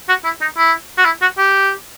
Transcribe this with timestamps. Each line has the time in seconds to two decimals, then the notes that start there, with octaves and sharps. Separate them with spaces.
0.09 F#4
0.24 E4
0.41 D#4
0.58 E4
0.98 F#4
1.05 E4
1.22 F#4
1.38 G4